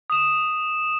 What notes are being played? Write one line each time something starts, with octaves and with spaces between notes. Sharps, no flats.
D#6 E7